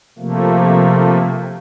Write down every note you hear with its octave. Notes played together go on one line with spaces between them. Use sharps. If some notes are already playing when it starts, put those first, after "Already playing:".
C3 F3 A3 A#3